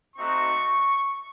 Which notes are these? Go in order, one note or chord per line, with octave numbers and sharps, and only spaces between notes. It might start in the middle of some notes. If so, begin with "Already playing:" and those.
A3 C4 D#4 F#4 C#6